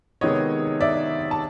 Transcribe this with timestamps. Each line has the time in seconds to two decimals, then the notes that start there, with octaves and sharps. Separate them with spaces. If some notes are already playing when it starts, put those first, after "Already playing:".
0.21 C3 D#3 G#3 B3 C#5 D#5
0.81 D5 E5
1.31 A5